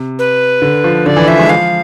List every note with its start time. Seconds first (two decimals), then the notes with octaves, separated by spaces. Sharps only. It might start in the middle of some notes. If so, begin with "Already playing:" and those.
Already playing: C3
0.19 B4
0.62 D3
0.84 F3
1.06 D3 D5
1.16 E3
1.28 F3 E5
1.39 G#3
1.49 F3 F5